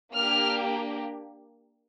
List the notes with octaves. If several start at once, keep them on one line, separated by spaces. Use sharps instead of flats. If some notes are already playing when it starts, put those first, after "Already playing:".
A#3 D4 G4 F6